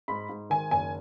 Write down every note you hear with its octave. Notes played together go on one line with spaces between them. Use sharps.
G#2 B5
G#2
D#3 G#5
F#1 G#5